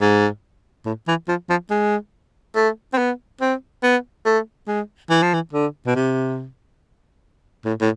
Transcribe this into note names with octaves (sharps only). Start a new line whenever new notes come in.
G#2
A2
E3
F3
F3
G#3
A3
C4
B3
C4
B3
A3
G#3
E3
F3
E3
D3
B2
C3
A2
A2